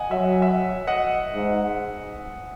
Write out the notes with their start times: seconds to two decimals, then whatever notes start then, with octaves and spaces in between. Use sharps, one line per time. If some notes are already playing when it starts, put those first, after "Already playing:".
Already playing: D#5 F#5 G#5
0.11 F#3 E5
0.42 E5
0.87 D#5 F#5
1.34 G#2